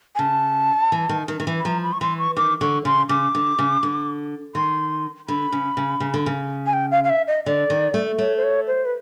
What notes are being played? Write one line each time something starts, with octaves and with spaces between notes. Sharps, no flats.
G#5
C#3 A5
E3
D#3
D#3
D#3
E3
B5
F3 A#5
B5
C#6
E3 C6
C#6
D#3 D6
D3 C#6
C#3 C6
C#3 D6
D3
C#3
D3
D#3 C6
D3 B5
C#3
C#3
C#3
D3
C#3
G#5
G5
F5
F5
E5
D#5
D3 D5
D#3
A3
A3 C#5
C5
C#5
C5
B4